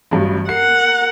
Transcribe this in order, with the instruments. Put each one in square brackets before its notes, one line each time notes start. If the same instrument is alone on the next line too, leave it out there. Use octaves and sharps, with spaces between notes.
[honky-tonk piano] A1 G2 F#3
[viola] A#4 F#5 [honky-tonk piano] C7